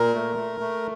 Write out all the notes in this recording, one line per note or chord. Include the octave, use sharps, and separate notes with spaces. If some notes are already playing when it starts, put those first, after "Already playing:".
Already playing: A#2 A#4
A3
A3
A3